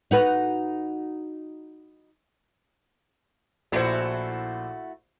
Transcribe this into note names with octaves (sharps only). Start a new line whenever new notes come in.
D#4 F#4 B4
A#1 A3 E4 F#4 C5